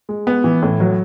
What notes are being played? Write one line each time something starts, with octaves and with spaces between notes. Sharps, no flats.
G#3
B3
E3
A2
F#3